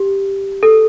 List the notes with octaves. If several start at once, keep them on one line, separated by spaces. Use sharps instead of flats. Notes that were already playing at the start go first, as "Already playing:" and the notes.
Already playing: G4
A4